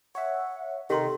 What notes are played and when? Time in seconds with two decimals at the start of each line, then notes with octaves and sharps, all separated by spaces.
0.15 C#5 E5 F#5
0.90 C3 D#3 G4 A4 A#4 C6